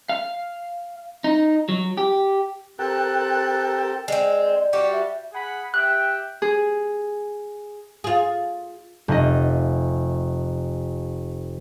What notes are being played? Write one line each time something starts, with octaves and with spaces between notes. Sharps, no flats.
F5
D#4
F#3
G4
C4 G4 A4 A#4 G5 A5 F#6
G#3 C4 D5
G3 F#4 G4
E5
G#4 F#5 B5
G4 E5 G5 F#6
G#4
F4 G#4
F1 D#5